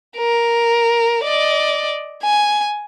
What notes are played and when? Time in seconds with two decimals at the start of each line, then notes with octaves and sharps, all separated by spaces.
0.17 A#4
1.24 D5 D#5
2.24 G#5